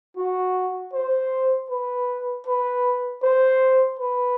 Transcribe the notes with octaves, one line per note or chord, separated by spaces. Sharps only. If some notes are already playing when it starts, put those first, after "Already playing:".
F#4
C5
B4
B4
C5
B4